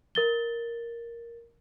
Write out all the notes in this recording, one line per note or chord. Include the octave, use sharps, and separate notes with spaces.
A#4 A6 G7